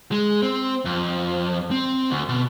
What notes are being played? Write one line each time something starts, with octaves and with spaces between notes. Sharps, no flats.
G#3
C4
F2
C4
D2
B2